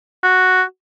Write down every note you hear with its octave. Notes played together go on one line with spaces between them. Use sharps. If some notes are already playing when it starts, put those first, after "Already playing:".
F#4